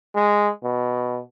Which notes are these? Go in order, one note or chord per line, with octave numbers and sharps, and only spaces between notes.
G#3
B2